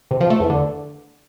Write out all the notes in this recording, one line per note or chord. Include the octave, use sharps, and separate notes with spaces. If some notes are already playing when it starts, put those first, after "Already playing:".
C3
F3
A3
E2
D3